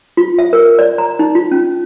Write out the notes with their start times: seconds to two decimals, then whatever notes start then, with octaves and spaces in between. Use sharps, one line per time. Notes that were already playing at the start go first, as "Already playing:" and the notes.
0.17 F4
0.39 E5
0.53 A#4
0.79 D5
0.98 A#5
1.19 D#4
1.35 F4
1.52 C#4